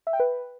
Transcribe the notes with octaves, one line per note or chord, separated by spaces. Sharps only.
E5
G5
B4